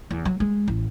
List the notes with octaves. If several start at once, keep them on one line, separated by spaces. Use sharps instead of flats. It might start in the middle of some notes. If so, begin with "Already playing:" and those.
E2
F#3
G#3
A1